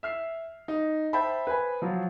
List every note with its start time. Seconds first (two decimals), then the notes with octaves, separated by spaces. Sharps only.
0.03 E5 F6 C7
0.68 D#4
1.13 C5 E5 G5 A5 B5
1.47 B4 C5 G#5 B5
1.82 F3 F#3 F4